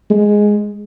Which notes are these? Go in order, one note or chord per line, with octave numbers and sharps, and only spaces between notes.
G#3